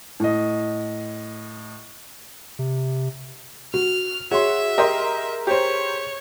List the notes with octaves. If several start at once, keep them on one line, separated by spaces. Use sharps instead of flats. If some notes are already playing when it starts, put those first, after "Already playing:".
A2 D#5
C3
F#4 F6
F#4 G#4 C#5 E5 C6
G4 A#4 D#5 C6
G4 C5 C#5